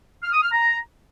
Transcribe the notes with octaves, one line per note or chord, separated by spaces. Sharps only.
F6
D#6
F6
A#5